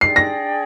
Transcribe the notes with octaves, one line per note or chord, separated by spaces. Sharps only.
D4 G#4 D5 G5 C7
A#6